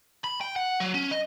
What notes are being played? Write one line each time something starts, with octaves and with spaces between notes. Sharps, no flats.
B5
G5
F#5
F#3
C#4
D#5